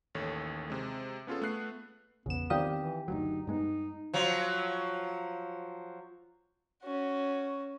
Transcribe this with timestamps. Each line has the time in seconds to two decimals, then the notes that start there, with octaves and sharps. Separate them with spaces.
0.15 A1 D#2 A4 C#5
0.70 C3 G#3
1.27 B3 C#4 F4 G#4 A4
1.42 A3 B3 F#6 C7
2.26 A1 E2 C#3 B3 E7
2.50 D#3 C4 G4 D5 F5 D#6
2.80 E3
3.08 F#1 D2 F#3 D#4
3.47 G2 G#3 B3 D#4
4.13 F3 F#3
6.84 C#4 F#4